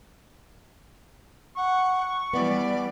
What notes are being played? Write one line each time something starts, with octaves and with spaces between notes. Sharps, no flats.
F#5 C#6
E3 G3 B3 D5